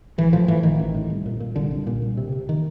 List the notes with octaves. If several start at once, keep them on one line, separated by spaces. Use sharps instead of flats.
A1 E3
A2 F3
A2 E3
A1 D#3
A1
A2
C2
A#2
A#2
C2 D3
C2
A#2
C2
C3
C3
D#3